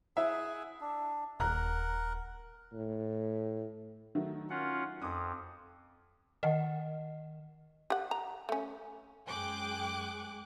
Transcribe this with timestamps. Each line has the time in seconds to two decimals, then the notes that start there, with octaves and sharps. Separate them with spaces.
0.17 E4 G#4 E5 F#5 G#5
0.81 D4
1.40 D#1 A#4 F#5 A#5 F#6
2.73 A2
4.15 D#3 F#3 A3
4.50 C#4 F4 F#5
5.02 F2 D6 D#6
6.43 D#3 D#5 F#5 G5
7.90 G4 F#5
8.11 A#5
8.49 A3 C#4
9.27 F#2 G#3 G#4 G5 D6 F#6